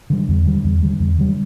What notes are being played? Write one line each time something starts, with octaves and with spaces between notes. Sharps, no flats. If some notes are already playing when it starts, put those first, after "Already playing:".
D3 G3
E2
D3 G3
E2
D3 G3
E2
D3 G3